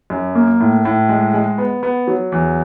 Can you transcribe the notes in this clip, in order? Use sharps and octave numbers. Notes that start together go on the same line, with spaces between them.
F#2
A#3
A2
A2
G#3
G#3
B3
B3
F#3
E2